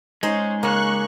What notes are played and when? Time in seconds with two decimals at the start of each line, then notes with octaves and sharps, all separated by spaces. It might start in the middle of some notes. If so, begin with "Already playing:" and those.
0.23 G#3 C#4 D#4 C5
0.63 C#3 A#3 C#4 C#6 F#6